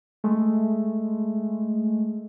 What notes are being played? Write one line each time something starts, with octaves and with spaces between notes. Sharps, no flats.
G#3 A3